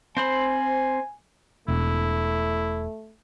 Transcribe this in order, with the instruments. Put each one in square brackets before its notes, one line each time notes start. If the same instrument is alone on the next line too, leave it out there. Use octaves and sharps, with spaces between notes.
[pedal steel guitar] C4 C5 B5 [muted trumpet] G#5
[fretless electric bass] E1 [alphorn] A3 [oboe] E4